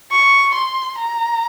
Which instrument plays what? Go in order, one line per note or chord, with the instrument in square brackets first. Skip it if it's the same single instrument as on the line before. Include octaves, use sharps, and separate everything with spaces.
[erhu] C#6
C6
A#5